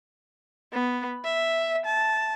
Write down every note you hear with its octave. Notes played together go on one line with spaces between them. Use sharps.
B3
E5
A5